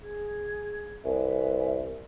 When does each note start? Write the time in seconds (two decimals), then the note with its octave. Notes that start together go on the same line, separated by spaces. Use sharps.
0.02 G#4 G#6
1.05 C2 B4 E5 G#5